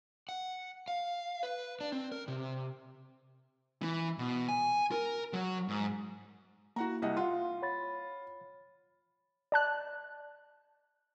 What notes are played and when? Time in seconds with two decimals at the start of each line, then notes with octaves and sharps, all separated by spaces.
0.29 F#5
0.88 F5
1.43 B4
1.81 D4
1.92 C4
2.12 A#4
2.28 C3
3.82 E3
4.18 B2
4.49 G#5
4.91 A#4
5.34 F#3
5.68 G#2
6.76 A#3 E4 F#4 F#5 A#5
7.02 C2 D#5 F#5
7.17 F4 F5 F#5 C6
7.62 C#5 B5 A6
9.52 D5 A5 F#6